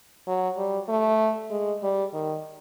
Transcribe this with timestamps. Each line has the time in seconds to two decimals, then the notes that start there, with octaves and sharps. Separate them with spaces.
0.28 F#3
0.58 G3
0.89 A3
1.51 G#3
1.83 G3
2.14 D#3